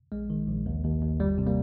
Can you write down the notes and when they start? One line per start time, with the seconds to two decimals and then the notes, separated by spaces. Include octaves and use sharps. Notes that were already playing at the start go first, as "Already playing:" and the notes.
0.12 A#1 G#3
0.30 D#3
0.48 A#1
0.66 D#2
0.84 D#2
1.02 D#2
1.20 G1 G3
1.38 C3
1.47 G3 A#3